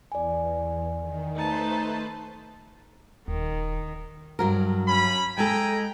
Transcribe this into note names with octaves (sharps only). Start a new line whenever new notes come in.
E2 D5 G#5
D#3
A3 D#4 B4 C5 A5
D#1 D#3
G2 F#3 A#4
C#4 B5
G#3 A4 G5 G#5 A#5